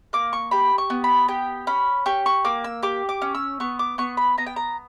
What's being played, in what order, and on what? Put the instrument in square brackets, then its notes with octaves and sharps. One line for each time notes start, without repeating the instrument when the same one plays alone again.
[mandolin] A#3 D6
C#6
G4 B5
C#6
B3
B5
G4 G5
C#4 B5
G4 C#6
C#6
A#3 D6
E6
G4 D6
D6
C#4
E6
B3 C#6
D6
B3 C#6
B5
B3 A#5
G5
A#5